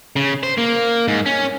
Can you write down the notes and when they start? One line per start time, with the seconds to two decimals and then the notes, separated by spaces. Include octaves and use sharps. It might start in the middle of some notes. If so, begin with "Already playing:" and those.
0.16 C#3
0.43 C5
0.58 A#3
1.08 G#2
1.26 C#4